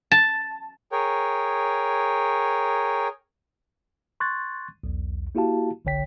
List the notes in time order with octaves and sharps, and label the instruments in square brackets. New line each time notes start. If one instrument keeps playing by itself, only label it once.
[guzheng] A5
[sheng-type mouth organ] G#4 A#4 C#5 G5
[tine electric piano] C6 C#6 F#6 G#6 A6
B1 E2
A#3 E4 F#4 G4 F5 A5
G1 C2 D3 C#5 G5 B6